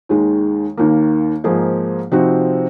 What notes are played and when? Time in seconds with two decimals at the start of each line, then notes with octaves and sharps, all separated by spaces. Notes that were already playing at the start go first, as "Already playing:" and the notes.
0.09 D#2 D#3 G#3
0.77 D#2 D#3 A#3
1.44 G#2 F3 A#3 D#4 G#4
2.11 C3 F3 C4 D#4 F#4